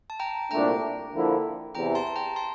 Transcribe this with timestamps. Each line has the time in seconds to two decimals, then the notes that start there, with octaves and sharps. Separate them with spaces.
0.10 A5
0.20 G5 A#5
0.51 C2 A#2 A3 D4 G5 A#5
1.13 D3 F3 A#3 E4
1.75 E2 C3 E3 G5 A#5
1.95 A5 C6
2.07 A5
2.16 G5 A#5
2.36 A5 C6